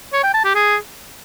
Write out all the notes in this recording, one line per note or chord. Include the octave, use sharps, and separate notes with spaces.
C#5
G5
A5
G4
G#4